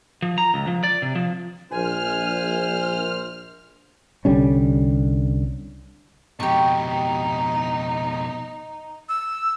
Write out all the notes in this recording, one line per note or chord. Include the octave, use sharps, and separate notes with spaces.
F3
A#5
C#2
F3
D5
C3
F3
A#1 C5 G#5 F6
C2 D3 G3 C#4
F2 B2 D#4 G4 C#6
E6